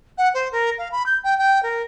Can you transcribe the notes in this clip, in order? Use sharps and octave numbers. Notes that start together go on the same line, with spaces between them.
F#5
C5
A#4
F5
B5
G6
G5
G5
A#4